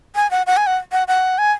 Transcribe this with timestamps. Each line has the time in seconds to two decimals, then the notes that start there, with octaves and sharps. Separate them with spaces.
0.15 G#5
0.31 F#5
0.47 F#5
0.57 G#5
0.67 F#5
0.92 F#5
1.08 F#5
1.38 G#5